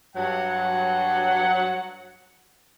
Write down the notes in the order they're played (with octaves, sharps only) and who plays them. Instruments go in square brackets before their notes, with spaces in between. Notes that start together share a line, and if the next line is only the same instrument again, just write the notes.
[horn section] G2 F#3 F#5